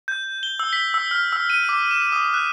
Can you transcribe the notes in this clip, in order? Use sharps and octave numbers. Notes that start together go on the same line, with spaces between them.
G6
G7
E6
B6
E6
F6
E6
D#7
D6
E7
D#6
F#6